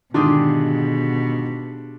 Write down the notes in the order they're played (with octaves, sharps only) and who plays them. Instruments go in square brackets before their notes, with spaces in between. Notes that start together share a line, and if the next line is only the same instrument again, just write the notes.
[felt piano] G#2 D3 D#3 [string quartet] B2 [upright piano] D4 [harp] F4 G4 G#4